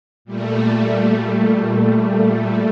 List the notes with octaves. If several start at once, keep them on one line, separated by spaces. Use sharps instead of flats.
A#2 G3 A3